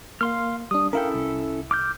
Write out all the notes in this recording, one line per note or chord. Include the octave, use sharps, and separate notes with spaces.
A#3 F5 C6 F6
G3 D4 D#6
C#4 E4 A4 A#4 F5 G5
C2
D6 F6 G6